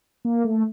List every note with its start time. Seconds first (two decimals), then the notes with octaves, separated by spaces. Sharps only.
0.25 A#3
0.44 A3